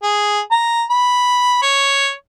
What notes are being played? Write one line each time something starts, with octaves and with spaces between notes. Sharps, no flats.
G#4
A#5
B5
C#5